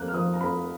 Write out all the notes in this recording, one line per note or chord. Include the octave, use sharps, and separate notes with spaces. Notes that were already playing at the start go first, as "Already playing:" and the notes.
Already playing: F2 A#3 F#6
F6
F3 D#6
A#5
F2 B5